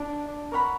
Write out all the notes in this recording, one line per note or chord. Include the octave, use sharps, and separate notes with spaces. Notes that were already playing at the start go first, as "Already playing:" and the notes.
Already playing: D4
A#4 C#5 F#5 B5